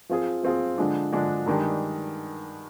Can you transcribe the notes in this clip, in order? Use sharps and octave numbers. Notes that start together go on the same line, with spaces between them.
F3 C4 F4 G#4
F3 C4 F4 G#4
D3 F3 G#3 D4
D3 F3 G#3 D4
G2 D#3 G#3 D4 G4